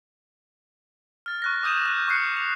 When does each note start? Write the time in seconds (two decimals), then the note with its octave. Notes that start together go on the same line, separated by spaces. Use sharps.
1.26 F6 A6
1.42 C#6 F#6 A#6
1.63 D6 D#6 G6 D#7 E7
1.86 F#6
2.08 C#6 D6 F#6 C7 C#7
2.37 F7